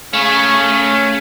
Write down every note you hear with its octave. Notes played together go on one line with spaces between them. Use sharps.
C#3 A3 C#4